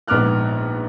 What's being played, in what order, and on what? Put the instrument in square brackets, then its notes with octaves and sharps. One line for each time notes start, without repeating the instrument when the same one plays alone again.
[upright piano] A#1 G#2 B3 D6 F6 F#6